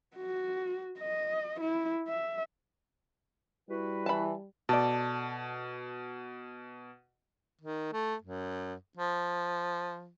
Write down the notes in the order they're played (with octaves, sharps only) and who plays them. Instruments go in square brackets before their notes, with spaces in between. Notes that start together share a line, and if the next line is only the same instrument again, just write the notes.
[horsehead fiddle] F#4
D#5
E4
E5
[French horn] G3 [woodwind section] E4 F#4 B4
[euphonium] E3 [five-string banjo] A5 B5
[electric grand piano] B2 [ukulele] A4 D5
[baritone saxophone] D#3
A3
F#2
F3